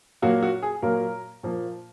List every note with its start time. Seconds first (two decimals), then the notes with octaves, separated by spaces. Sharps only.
0.22 A#2 F#3 A#3 F#4
0.43 F#4
0.62 G#4
0.82 A#2 F#3 A#3 A#4
1.43 A#2 F3 A#3